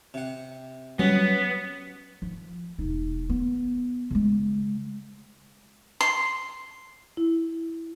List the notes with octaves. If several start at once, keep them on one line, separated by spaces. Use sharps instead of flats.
C3 F#5
F#3 G3 B3 C#4
F3
E1 D#4
B3
C#3 G#3
C6
E4